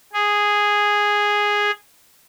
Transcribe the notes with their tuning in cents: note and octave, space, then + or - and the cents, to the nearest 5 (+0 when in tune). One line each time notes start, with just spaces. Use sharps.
G#4 -5